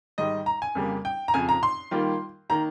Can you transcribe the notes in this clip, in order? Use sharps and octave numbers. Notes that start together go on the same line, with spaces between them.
G#2 D#3 G3 D#5
A#5
G#5
F2 C#3 G3 A#3
G5
A#5
F2 C#3 F3 G#5
A#5
C6
D#3 G3 A#3 F4
D#3 A#3 A#5